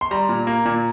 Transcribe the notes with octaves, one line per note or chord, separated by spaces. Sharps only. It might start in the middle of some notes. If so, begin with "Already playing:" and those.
C6
G3 A#5
A#2
A#3
A#2